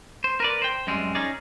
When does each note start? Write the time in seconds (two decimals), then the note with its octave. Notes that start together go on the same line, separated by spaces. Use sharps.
0.24 C5
0.40 A#4 B4 D5
0.62 C5 G5
0.87 F#2 G3 G#3 C4
1.15 C#4 D#4 G#4 D5